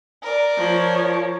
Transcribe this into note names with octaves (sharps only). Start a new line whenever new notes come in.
A#4 D5
F3 C#5